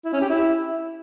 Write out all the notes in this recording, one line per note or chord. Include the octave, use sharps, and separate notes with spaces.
E4
C#4
G4
E4